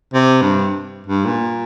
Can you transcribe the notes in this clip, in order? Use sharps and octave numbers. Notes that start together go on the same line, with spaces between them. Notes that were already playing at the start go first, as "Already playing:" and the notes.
C3
G2
G2
A#2